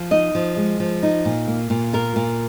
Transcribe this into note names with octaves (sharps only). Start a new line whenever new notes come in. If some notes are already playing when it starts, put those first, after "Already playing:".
Already playing: F3
D#4 D#5
F3
G#3
F3
D#4
A#2
A#3
A#2
F4 A#4
A#2